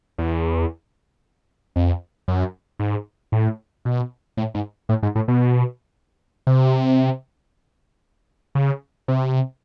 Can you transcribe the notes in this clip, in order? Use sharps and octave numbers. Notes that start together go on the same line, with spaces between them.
E2
F2
F#2
G#2
A2
B2
A2
G#2
A2
G#2
A2
B2
C3
C#3
C3